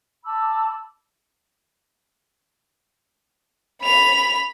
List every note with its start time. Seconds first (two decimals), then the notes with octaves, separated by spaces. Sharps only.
0.24 A5 B5 D6 E6
3.83 B5 F7